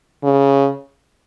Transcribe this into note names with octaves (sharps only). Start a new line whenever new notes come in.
C#3